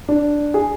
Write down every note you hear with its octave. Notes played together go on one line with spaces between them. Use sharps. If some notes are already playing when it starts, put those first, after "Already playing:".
D4
G#4